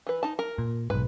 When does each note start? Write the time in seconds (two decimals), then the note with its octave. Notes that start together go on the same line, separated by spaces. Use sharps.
0.07 E3 B4
0.23 D#4 A5
0.39 A#4
0.58 A#2
0.90 B1 G#2 B4